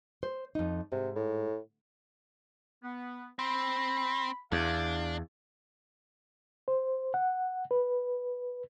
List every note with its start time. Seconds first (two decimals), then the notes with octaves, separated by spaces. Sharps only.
0.23 C5
0.55 F2 D#4
0.92 G#2 C3
1.16 A2
2.83 B3
3.39 C4 B5
4.52 E2 D4 F5
6.68 C5
7.14 F#5
7.71 B4